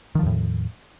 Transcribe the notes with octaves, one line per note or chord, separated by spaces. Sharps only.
E2 A2 D#3 F3